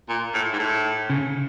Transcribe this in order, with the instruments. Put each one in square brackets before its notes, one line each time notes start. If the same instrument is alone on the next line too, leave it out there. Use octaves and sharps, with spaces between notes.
[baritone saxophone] A#2
A2
G#2
A2
[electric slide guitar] C#3